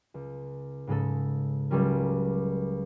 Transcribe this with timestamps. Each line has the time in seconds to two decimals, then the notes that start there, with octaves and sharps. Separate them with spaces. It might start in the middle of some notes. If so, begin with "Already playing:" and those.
0.14 C#2
0.87 G#2 C#3 G#3 A4
1.70 C#2 F#3 G3 C#4 A#4